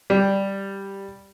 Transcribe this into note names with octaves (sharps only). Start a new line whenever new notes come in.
G3